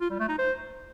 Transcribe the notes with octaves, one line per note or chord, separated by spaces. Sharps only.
F4
G3
A3
D#4
C5